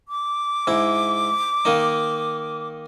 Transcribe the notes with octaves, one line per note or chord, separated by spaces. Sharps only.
D6
G#2 E4
D#3 A#3 D#4